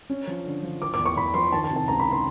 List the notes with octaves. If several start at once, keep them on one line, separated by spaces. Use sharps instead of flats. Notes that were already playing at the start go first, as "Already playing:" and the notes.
C#4
F3
D3
F3
F3 D6
D6
E2
C#6
E2 B5
F3 C6
D#3 A5
A5
C3
A5
C#2 A#5
B5
C6